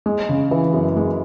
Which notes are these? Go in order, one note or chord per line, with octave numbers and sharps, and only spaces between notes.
G#3
C#3
E3
F#2
G#3